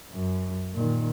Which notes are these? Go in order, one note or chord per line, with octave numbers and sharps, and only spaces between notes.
F#2
A#2 D#3